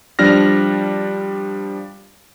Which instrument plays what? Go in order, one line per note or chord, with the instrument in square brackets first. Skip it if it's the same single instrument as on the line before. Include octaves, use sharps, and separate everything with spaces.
[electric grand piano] F3 G3 D4 F6 A#6